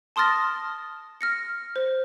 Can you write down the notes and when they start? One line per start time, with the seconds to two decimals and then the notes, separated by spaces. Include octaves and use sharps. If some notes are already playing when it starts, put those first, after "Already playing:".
0.16 A5 C6 D#6 F6 A6 A#6
1.21 F6 A#6 C#7
1.76 C5